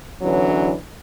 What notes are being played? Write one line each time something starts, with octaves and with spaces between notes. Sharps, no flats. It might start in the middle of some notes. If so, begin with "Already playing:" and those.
E2 D3 E3 F#3 C#4 D4